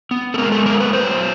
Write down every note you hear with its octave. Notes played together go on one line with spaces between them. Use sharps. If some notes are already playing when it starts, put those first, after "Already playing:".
B3
A4
G#3 A#4
A4
B3 A#4
B4
F#3 C5